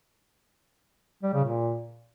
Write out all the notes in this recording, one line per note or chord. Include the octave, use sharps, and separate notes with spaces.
G3
C#3
A#2